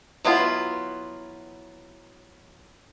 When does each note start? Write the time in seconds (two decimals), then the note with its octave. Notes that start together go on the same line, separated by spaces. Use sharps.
0.25 F#3 B3 E4 F4